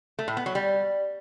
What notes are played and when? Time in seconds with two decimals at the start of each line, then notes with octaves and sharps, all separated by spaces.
0.19 A3
0.28 A2
0.37 B3
0.46 F#3
0.55 G3